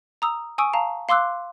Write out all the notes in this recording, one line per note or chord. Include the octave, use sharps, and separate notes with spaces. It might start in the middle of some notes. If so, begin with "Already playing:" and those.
A#5 D#6 E6
G#5 C#6 D#6 E6 D7
F5 A5 A#5
F5 C6 D6 E6 F#6